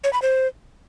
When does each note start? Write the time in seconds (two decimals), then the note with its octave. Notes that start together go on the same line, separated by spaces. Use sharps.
0.04 C#5
0.13 B5
0.22 C5